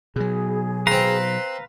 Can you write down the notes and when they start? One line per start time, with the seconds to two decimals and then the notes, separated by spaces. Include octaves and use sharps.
0.16 B2 F#3 G#4
0.87 C4 B4 F5 A#5 C6